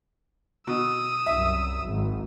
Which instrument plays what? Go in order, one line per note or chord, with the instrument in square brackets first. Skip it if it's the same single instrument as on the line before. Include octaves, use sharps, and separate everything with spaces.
[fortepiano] B2 [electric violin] D#6 E6
[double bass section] C2 F#2 [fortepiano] E5
[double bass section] G#1